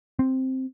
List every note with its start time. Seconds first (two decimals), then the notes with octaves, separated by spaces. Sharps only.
0.19 C4